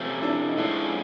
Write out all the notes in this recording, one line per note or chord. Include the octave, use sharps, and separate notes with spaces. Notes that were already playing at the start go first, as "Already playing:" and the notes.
Already playing: C3 F3 A3 C#4
D4 E4
D#4
F2 D3 F3 G#3 C#4 D4 E4